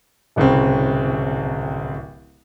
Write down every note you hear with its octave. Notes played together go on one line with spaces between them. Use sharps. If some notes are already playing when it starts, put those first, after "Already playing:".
D1 C2 C#3 C4